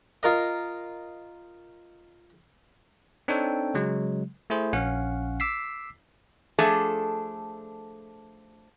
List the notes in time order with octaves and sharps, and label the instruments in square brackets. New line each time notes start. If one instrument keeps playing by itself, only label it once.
[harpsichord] F4 A#4 D#5
[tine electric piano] C4 D4 D#4 A4 C#5 G5
C#3 F#3 G#3
A3 E4 G#4 C5
A#1 C#4 C#5 F5 F#5
D6 E6 B6 C7
[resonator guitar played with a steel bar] F3 A3 D4 G#4 A4